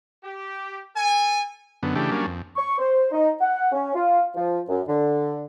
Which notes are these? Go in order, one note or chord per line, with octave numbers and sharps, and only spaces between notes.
G4
A4 G#5
F#2 D3 B3
C#3 E3 A3 D4 G4
F#3 G3 A#3 C#4 D4
F2
C#6
C5
D#4
F#5
C#4
F4
F3
F#2
D3